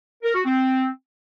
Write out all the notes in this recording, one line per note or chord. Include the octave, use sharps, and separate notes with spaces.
A#4
F#4
C4